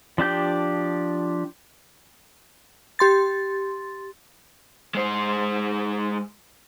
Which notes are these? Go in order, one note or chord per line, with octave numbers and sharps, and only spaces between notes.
F3 D4 G4 G6
G4 C6 A6
G#3 C5